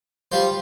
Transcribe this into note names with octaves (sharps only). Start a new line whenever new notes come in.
G3 F4 C5